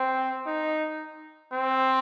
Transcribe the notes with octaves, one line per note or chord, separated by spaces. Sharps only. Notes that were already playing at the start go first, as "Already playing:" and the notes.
Already playing: C4
D#4
C4